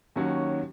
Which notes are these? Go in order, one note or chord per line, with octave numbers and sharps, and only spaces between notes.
D#2 D#3 F#3 C#4 F#4